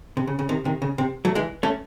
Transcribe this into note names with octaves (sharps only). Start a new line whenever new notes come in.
C3
C#3
C#3
C3 D#3
C3 D#3
C#3
C3
F#3 A3
E3 G#3
A3 C#4